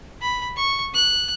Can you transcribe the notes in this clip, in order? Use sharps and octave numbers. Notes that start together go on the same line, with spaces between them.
B5
C#6
F#6